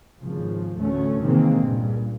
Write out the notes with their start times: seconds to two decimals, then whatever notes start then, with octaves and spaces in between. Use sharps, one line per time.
0.21 G#1 C#3 F3
0.76 A1 D2 A3 C#4
1.22 C3 D#3 E3 G#3 A#3 C4
1.58 C#2 G2 A#2